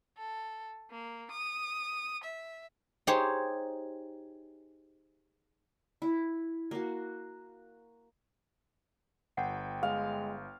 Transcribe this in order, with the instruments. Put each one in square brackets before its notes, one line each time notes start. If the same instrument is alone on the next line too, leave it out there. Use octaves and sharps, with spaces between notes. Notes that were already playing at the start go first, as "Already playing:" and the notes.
[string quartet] A4
A#3
D#6
E5
[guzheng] D#4 G4 G#4 C5 C#5
[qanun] E4
A#3 F#4
[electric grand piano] G1 G5 [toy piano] F#5
[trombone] G#3 [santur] F5